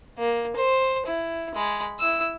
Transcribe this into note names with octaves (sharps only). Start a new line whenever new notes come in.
A#3
C5
E4
G#3 B5
E4 E6